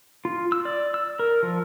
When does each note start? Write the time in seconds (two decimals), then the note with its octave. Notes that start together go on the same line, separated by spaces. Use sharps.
0.25 F4
0.52 E6
0.65 D5
0.94 E6
1.19 A#4
1.43 F3